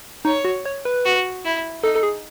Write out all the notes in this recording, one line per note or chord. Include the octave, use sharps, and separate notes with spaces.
D#4 C#5
F#4
C#5
B4
F#4
E4
D#4 A4
A4
G#4